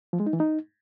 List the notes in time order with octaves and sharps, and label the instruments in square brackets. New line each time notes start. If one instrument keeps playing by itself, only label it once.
[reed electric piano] F3
G#3
D#4
E3
D#4